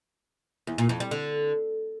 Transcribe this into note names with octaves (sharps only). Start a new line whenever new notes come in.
E2
A#2
F2
G3
D3